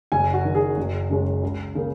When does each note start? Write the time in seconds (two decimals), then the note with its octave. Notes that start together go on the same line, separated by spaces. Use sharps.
0.12 F#1 G#5
0.33 F#4
0.44 F#2 D#3
0.55 G#4
0.77 F#1
1.10 F#2 C#3 G#3 C#4
1.43 C#2
1.75 C#3 A#3